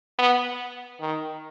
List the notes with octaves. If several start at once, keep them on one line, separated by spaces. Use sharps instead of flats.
B3
D#3